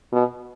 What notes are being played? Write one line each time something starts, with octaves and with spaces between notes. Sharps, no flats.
B2